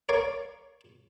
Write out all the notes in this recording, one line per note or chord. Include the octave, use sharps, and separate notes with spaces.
A#4 C#5 D5 F5